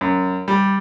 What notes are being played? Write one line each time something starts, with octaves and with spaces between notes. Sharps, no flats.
F#2
G3